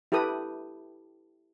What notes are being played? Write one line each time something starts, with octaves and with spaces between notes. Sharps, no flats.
E4 G4 A4 B4 D#6